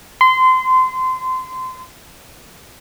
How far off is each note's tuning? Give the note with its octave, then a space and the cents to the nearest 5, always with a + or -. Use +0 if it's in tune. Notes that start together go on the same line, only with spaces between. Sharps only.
C6 -25